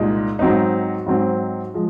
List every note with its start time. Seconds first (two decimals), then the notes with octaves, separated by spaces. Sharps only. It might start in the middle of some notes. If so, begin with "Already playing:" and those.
Already playing: C2 A#2 G#3 D#4
0.39 G#2 F#3 C4 D#4
1.06 G#2 F#3 C4 D#4
1.74 F3 G#3